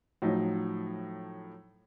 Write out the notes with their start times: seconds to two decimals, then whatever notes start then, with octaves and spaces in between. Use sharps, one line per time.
0.22 A2 F3 F#3 D#4